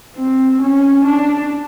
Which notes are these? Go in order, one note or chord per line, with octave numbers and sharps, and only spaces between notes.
C4
C#4
D4